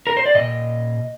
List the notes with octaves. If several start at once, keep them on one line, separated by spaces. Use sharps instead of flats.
A#4
C5
D5
A#2 D#5